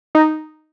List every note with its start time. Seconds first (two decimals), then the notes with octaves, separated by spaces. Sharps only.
0.15 D#4